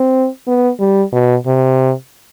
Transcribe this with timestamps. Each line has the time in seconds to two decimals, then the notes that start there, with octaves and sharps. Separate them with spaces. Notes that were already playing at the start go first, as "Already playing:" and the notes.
Already playing: C4
0.47 B3
0.80 G3
1.12 B2
1.46 C3